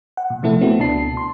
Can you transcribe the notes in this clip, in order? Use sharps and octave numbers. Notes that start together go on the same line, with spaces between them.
F#5
A#2
C3 F3 A3 E4 A4
A3 B3 C4 E4 F#4
C#2 B2 D4 A5 C7
C6